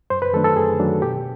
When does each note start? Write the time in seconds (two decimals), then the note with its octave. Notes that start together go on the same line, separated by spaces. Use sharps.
0.10 F#2 C5
0.22 B4
0.33 D#3 F#3 A3 D4 A4
0.44 A4
0.56 F#2 G#4
0.79 D#3 F#3 A3 D4
1.02 B2 G4